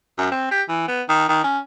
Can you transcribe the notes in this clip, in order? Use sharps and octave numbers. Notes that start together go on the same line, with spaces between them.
F#2
C4
G4
E3
B3
D#3
D#3
C#4